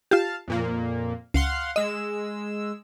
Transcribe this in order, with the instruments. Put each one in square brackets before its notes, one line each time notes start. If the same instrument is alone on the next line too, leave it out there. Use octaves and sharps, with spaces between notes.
[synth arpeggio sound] F4 G4 [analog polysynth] F5 A5
[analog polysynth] F2 A#2 A#3
[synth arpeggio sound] C#2 [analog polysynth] F5 F#5 C6
[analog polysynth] G#3 E6 [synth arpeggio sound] D#5